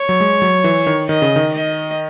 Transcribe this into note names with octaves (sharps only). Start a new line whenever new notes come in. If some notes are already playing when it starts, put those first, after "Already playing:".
Already playing: C#5
F#3
G#3
F#3
E3
D#3
D#3 D#5
C#3
D#3
D#5